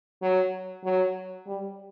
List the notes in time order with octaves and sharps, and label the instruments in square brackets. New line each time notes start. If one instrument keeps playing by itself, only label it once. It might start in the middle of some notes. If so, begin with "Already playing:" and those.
[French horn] F#3
F#3
G3